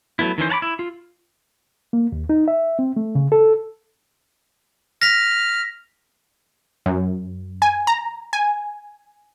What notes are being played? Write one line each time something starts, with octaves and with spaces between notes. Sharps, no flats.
F#3 A3 B3 E4
D#3 E3 C#4 C5
C#5 F#5 A5 B5 D6
E4
F4
A#3
D#2
D#4
E5
C4
A3
C#3
A4
F6 A#6 B6
F#2
G#5
A#5
G#5